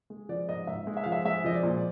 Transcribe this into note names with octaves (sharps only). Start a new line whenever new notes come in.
G#3
F3 D5
G#2 D#5
G#2 E5
G#3
E5
F3 F5
E5
G#3 E5
F3 D#5
D5
A#2